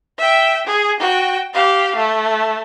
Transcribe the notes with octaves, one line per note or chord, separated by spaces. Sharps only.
E5 G5
G#4
F#4 G5
G4 F5
A3